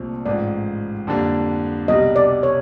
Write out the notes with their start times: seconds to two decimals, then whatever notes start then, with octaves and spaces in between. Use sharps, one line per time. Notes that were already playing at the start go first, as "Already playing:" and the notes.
Already playing: C2 A#2 F3 A3 C4
0.25 A1 G#2 F3 D5
1.07 F2 D3 G3 A#3 D4
1.88 C2 B2 G3 D#5
2.16 D5
2.43 C#5